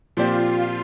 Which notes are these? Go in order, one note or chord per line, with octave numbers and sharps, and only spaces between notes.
A#2 F3 C4 F4 G4 D5